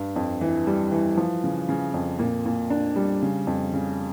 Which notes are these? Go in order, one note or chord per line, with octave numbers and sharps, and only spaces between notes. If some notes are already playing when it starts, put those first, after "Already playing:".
Already playing: G2
F2
E3
G3
E3
F3
C#3
C#3
F2
A#2
A#2
D4
G3
C#3
F2
C#3